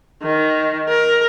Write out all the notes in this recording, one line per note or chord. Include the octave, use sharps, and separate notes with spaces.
D#3
A#4